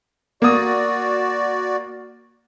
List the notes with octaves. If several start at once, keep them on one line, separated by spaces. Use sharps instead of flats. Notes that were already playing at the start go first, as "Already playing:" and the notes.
A#3 F#4 D5 D#6